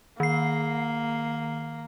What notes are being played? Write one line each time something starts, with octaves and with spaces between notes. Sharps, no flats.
D#3 A#3 C7